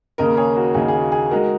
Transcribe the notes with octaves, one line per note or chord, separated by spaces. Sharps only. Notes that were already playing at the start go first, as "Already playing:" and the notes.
D#2 C#3 A#3 D#4 A#4 D#5
G#4 C#5
F#4 A#4
D#2 C#3 A#3 D#4 G#4
G#4
F#4
G#4
G#3 D#4 F#4 A#4